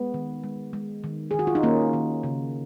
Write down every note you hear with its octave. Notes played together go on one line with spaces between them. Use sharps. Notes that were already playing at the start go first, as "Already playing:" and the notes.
Already playing: G#3 B3
D#3
G#3
G#3
D#3
G#4
D#3
F#4
F4
D#4
D#3 A#3 C#4
D#3
C#3